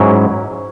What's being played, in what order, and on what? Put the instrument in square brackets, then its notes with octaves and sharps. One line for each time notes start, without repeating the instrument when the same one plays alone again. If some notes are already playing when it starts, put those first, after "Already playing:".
Already playing: [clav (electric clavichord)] G#2 F#3 C#4 E4